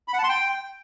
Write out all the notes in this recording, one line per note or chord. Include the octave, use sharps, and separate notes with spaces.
B5
F#5
A5
C6
G5